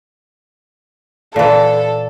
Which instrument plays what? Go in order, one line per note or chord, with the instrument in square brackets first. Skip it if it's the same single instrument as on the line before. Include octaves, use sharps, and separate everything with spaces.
[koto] A#2 E3 [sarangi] A4